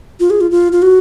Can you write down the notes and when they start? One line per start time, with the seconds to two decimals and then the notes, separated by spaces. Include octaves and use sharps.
0.20 F4
0.30 G#4
0.41 F4
0.51 F4
0.72 F4
0.82 F#4